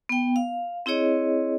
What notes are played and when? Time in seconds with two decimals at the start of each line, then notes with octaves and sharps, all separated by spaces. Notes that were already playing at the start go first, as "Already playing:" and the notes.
0.09 B3 G5
0.36 F5
0.86 C4 E4 G#4 C#5 D#5